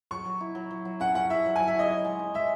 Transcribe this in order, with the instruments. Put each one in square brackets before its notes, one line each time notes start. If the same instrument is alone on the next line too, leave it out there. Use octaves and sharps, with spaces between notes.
[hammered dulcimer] F#3 [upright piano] C#6
[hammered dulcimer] F#3
E4
F#3
F#3
F#3
[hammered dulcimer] C#4 [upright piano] F#5
[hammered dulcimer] C#4 [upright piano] F#5
[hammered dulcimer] E4 [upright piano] E5
[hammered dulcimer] F#3
[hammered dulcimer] F#3 [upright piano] G#5
[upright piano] E5
[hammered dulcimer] E4 [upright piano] D#5
[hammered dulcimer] D#4
G#3
D#4
[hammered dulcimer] G#3 [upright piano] E5